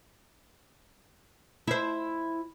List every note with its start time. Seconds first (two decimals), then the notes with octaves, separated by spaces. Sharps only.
1.67 E4 C5